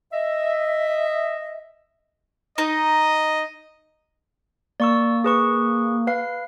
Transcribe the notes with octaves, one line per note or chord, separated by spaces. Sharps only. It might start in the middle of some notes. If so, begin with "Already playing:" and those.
D#5 E5
D#4 D#5
A#3 D5 C#6 E6
G#4 B4 C#6
B4 F5 C7